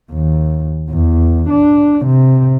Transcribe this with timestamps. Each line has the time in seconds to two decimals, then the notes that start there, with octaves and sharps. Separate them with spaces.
0.12 D#2
0.91 E2
1.50 D4
2.06 C3